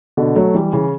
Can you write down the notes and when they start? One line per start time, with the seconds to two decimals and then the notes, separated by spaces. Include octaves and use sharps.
0.17 B2 D3
0.36 F#3 A3
0.54 E3 G3
0.73 C#3 E3